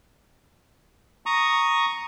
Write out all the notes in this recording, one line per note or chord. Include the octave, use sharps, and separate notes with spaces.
A#5 C#6 D#6